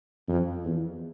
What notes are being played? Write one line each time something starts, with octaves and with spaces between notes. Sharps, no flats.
F2
E2